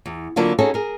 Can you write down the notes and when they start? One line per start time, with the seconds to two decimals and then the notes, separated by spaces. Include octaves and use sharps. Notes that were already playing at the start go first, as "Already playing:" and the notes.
0.06 E2
0.36 D3 F#3 A#3 D4 E4 F4
0.59 C#4 D#4 F#4 G#4 A4 C#5
0.74 G#4 A#4